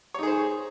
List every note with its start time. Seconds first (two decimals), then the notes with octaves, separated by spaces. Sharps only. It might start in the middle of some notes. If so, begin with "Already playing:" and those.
0.14 C#5
0.19 D#4
0.23 G#4
0.27 C5